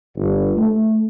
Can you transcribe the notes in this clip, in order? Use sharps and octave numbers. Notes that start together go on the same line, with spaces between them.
G1
A3